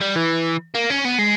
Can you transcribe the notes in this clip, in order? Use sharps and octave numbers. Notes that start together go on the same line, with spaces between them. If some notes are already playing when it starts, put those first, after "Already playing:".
G3
E3
A#3
C#4
B3
G#3